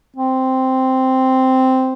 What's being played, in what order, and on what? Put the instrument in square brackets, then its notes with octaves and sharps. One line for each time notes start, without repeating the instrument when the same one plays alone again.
[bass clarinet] C4